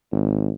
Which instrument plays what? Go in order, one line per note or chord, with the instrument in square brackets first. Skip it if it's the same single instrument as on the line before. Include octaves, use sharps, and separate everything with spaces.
[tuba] G#1